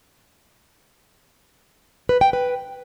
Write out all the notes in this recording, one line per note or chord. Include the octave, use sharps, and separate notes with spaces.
B4
G5
B4